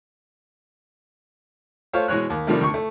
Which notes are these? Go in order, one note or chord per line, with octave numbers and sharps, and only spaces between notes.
A3 F4 C5 C#5 F5
B2 E3 G#3 C#5 F#6
D#2
C3 D#3 F3 G3 A3
D2 C#6
A3